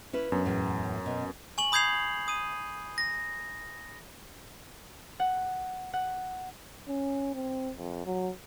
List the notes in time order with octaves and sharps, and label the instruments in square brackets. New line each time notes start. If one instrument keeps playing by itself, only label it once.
[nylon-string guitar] C#4 E4 B4
[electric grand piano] F#2 [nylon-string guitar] B3 D4
[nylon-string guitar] E2 A2
B2
[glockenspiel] G#5 C#6 F#7
B5 D#6 G6 G#6 C7 F7
D#6 D#7
A#6
[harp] F#5
F#5
[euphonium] C#4
C4
F2
F#3